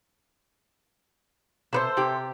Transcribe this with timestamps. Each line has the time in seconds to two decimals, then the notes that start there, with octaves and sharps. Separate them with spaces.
1.73 C3 A4 B4 C5
1.97 C3 G4